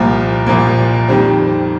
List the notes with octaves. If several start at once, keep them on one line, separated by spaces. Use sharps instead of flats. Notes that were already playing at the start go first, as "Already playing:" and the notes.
Already playing: C2 A#2 F3 A#3 A#4
C2 A#2 F3 A#3
F2 D#3 G3 C4